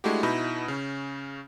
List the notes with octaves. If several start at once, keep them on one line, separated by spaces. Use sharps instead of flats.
G#3 A3 D4 E4 F#4 G4
B2 D#4 E4 B5 G6
C#3 C#4